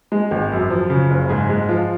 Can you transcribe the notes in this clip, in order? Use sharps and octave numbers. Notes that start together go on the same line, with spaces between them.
G#3
G#1
F#2
F3
C#3
F#1
G#2 G#4
G#3
F3 F4